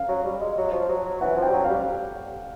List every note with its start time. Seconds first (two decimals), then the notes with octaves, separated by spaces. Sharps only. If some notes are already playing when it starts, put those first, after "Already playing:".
Already playing: F5
0.08 F#3
0.25 G3
0.40 G#3
0.57 F#3
0.73 F3
0.89 F#3
1.05 F#3
1.21 E3 F#5
1.37 F3
1.42 G5
1.49 G3
1.53 F#3
1.64 F5
1.69 G3